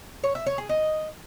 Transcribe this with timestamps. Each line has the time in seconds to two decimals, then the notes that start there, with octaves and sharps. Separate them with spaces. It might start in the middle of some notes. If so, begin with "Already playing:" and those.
0.24 C#5
0.35 E5
0.46 C#5
0.58 G#4
0.69 D#5